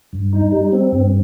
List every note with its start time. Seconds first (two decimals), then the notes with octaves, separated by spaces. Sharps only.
0.13 G2
0.33 D#4
0.52 G3
0.72 C4
0.92 G2